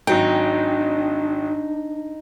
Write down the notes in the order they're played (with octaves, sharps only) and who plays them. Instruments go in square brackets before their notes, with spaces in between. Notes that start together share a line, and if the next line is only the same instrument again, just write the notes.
[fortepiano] G#1 F#3 G5 [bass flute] D4 [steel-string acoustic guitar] D#4